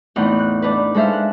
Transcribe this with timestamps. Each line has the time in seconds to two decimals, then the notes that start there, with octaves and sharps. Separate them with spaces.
0.16 E2 A2 C4 D#4 F#5
0.39 F#6
0.62 D4 D#4 B4
0.95 G#3 A4 C5 E5 F5
1.13 F#6